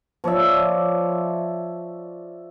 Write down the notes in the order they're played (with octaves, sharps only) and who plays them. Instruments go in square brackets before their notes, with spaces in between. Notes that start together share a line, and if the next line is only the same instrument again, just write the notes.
[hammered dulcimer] F3 C#5 D5 E5